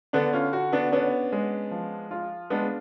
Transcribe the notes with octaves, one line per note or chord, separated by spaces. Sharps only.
D3 B3 D4
C#4 F4
F#4
B3 D4
B3 C#4 D4
G#3
F3
F4
G#3 B3 D4